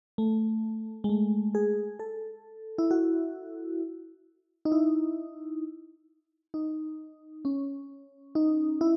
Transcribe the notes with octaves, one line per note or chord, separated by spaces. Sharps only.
A3
G#3
A3
G#4
A4
E4
F#4
D#4
E4
D#4
C#4
D#4
E4